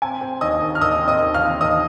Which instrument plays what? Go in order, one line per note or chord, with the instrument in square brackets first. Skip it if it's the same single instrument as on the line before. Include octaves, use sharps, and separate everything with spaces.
[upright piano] C4 G#5
C4
D#2 D#5 D#6
D#2
F6
D#2 D#5 D#6
C4
D#5 D#6
D#2
F5 F6
C4
D#2 D#5 D#6